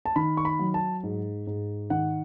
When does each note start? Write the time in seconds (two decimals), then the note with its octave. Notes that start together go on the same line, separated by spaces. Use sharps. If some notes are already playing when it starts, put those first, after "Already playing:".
0.05 A5
0.16 D#3 B5
0.37 C#6
0.45 B5
0.59 F#3
0.74 A5
1.03 G#2
1.47 G#2
1.90 D#3 F#5